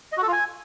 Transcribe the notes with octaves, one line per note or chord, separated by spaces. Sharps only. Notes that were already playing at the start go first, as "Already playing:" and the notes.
D#5
F#4
A4
F4
G#5